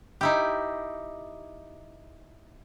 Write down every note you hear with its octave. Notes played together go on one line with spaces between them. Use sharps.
D#4 E4 G4